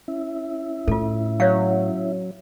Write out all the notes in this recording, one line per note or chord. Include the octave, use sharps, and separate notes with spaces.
C#4 E4 E5
A2 F4 A4
F#3 C#5 F5